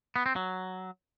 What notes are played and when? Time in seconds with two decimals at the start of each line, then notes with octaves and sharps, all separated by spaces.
0.16 B3
0.26 C4
0.36 F#3